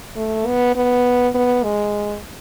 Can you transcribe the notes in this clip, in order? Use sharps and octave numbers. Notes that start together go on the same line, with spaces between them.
A3
B3
B3
B3
G#3